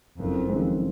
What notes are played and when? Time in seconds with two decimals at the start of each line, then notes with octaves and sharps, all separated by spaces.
0.18 F#1 F2
0.49 F#2 D#3 G#3 C4